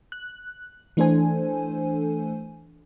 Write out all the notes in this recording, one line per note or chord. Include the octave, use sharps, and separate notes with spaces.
F#6
E3 A3 D4 A4 C5 G#5